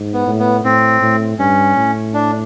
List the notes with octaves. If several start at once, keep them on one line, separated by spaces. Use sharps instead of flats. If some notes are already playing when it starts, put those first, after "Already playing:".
Already playing: G#2
B3
A2
B3
A2 C4
A2
G2 C#4
A2
D4